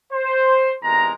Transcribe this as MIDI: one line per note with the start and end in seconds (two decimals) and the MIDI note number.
0.13 0.74 72
0.83 1.12 40
0.83 1.12 48
0.83 1.12 56
0.83 1.12 63
0.83 1.12 70
0.83 1.12 82